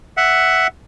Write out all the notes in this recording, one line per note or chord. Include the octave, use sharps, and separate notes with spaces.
E5 F#5